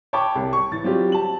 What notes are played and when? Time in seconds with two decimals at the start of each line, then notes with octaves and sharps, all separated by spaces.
0.13 C#5 G5 A5 B5 C#6 D6
0.35 C2
0.53 C#6
0.72 E3 A6
0.84 F#3 G3 C4 F4 G4
1.12 A5 F#7